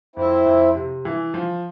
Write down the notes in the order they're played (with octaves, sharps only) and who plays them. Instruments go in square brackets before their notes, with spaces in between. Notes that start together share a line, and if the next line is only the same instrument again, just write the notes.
[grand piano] F2 [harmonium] C4 E4
[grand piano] F2
C3
E3
F3